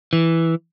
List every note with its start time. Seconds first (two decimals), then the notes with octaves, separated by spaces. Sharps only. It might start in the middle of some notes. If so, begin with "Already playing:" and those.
0.13 E3